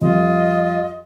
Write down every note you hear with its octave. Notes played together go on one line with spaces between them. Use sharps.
F2 G3 F4 D#5